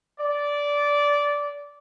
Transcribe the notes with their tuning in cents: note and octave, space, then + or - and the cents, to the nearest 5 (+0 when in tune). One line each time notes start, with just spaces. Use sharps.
D5 -15